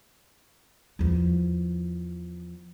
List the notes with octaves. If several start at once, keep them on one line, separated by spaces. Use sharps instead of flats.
E2 F3